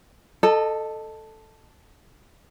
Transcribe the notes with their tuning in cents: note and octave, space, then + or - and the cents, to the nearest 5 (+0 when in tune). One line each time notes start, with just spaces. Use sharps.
A4 +0 D#5 -20 A5 +40